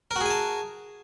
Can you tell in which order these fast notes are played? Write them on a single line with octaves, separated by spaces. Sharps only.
A#4 F#4 G#4 G#5 A5